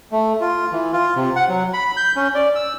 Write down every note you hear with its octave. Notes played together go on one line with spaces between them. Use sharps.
A3
F4
E3
F4
C3
F#5
F#3
B5
G6
C#4
D5
E6